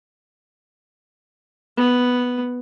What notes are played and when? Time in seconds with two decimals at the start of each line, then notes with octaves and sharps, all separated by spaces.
1.77 B3